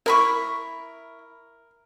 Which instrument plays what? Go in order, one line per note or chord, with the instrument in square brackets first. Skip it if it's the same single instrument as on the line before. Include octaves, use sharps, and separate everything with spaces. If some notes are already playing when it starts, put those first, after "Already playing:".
[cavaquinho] E4 B5 C#6 [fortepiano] A#4